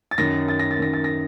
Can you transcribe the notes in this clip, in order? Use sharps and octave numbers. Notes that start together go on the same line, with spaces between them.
A6
F#2 D#3 A#6
A6
A#6
A6
F#2 D#3 A#6
A6
A#6